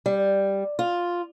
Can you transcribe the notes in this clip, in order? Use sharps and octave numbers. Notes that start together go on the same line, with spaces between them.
G3
F4